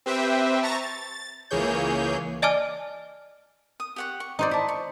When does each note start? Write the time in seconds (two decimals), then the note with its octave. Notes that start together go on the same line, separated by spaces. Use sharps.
0.06 C4 G4 B4 C5 E5 G5
0.63 A5 A#5 C#6 A6 A#6
0.82 A6
1.50 C#2 E3 A#3 G#4 C#5 G6
2.42 D5 D#5 G#5 A5 D6 F6
3.80 D#6
3.96 G4 F#5 C#6
4.20 C#6
4.39 D#4 C5 D5
4.51 E4 A5
4.68 C#6